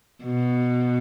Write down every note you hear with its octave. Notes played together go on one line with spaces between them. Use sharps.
B2